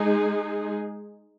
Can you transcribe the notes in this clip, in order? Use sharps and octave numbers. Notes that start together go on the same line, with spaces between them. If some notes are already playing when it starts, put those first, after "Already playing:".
Already playing: G#3 D#4 G#4